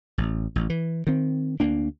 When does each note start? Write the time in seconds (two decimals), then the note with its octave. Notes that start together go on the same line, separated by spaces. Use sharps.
0.18 A1
0.56 A1
0.70 E3
1.07 D#3 C4
1.60 D2 A#3 D4